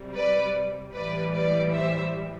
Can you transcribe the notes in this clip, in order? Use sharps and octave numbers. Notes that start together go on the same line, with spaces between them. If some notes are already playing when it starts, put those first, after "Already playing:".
Already playing: C3 G3
B4 D5
A2 E3 G3 B4 D5
B4 D5
C5 E5